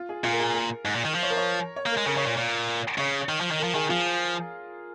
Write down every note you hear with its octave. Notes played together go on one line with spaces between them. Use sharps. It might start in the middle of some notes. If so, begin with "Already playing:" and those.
Already playing: F4
G#4
A#2 F4
A#4
G#4
A#4
G#2
A#2
D#3
F3
C#5
A#4
C#5
C#5
A#3
A#4
G#3
C#3 A#4
C#3 C#5
A#2
A#2
C#3 C#5
D#3
F3
D#3
F3 A#4
D#3 G#4
F3 F4